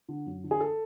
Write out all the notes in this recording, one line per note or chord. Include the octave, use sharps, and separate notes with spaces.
D3
F#2
D3
G#4
A4